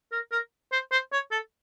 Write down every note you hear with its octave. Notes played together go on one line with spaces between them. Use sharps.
A#4
A#4
C5
C5
C#5
A4